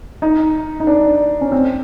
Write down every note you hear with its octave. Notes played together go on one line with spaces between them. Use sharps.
D#4
D#4
D4
C#4
C4